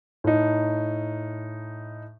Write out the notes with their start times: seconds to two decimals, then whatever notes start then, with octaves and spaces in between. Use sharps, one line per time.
0.24 A2 D#4